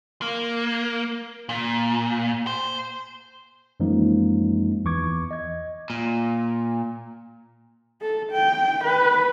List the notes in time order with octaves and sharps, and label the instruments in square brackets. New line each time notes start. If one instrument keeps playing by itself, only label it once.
[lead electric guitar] A#3
A#2
C5
[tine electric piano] F#2 E3 F3 G#3 A#3 D#4
E2 E3 C#6 D6 G#6
D#5 G#6
[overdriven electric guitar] A#2
[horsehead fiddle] A4
G5
B4